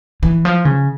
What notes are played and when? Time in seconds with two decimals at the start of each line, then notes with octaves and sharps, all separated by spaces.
0.23 E3
0.45 F3
0.65 C#3